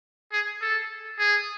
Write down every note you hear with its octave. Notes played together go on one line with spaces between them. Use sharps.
G#4
A4
G#4